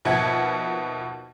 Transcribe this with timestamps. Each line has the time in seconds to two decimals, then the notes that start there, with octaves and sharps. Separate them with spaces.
0.05 D#2 B2 F3 E5 F#5 G#6